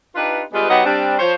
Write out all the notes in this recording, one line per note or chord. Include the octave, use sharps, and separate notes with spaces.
D4 D#4 F4 G4 B4
G3 G#3 B3 F4 G#4 B4
F#3 B3 D#4 G4 D#5 F#5
G3 C4 D4
F3 C5 C#5